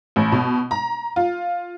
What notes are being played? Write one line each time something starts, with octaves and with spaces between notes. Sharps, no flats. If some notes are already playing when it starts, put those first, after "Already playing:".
A1
B2
A#5
F4